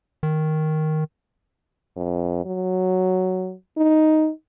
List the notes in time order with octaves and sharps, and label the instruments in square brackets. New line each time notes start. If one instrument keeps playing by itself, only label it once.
[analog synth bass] D#3
[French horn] F2
F#3
D#4